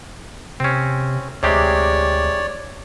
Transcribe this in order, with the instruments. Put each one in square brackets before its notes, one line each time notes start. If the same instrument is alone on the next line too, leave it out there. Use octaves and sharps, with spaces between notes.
[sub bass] C3 [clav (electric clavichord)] C4 C#4
[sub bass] D2 [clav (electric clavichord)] C3 G#3 G4 [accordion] C#5 D5